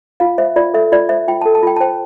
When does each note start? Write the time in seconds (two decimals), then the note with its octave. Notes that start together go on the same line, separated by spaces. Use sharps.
0.20 F4 F5
0.38 C5 E5
0.56 F4 D5
0.74 A4 E5
0.92 F4 D5
1.09 C5 E5
1.28 F4 G5
1.41 A4 A5
1.55 A5
1.63 F4 G5
1.76 A5
1.80 C5 G5